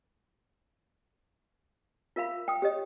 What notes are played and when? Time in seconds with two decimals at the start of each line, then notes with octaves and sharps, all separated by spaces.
2.16 F4 A#4 E5 F5 B5
2.48 G5 D#6
2.62 G4 C#5 D#5